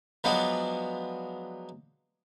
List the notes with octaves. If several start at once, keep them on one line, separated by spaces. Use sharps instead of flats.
F3 F#3 G#3 B3 D4 F4